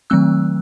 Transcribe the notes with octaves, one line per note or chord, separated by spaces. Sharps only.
D#3 F#3 A3 C4 E6 F#6